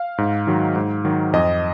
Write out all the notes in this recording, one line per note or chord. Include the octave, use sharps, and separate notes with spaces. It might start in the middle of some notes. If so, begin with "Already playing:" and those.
Already playing: F5
G#2
D#3 F#3
G#2
D#3 F#3
F2 D#5